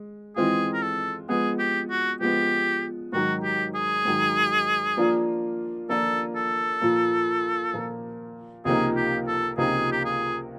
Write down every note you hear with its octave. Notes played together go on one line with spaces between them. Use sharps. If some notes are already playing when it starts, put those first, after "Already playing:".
Already playing: G#3
E3 G#3 C4 F4 G#4
A#4
A4
F3 G#3 B3 G#4
G4
F#4
F3 G#3 B3 G4
G#2 D#3 F#3 F#4
G4
G#4
G#2 D#3 F#3
F3 A#3 D4 F4
F3 A#3 D4 F4 A4
A4
A#2 F3 A#3
A#2 F3 A#3
C#2 C3 F3 A#3 D#4 G#4
G4
A4
C#2 C3 F3 A#3 D#4 G#4
G4
G#4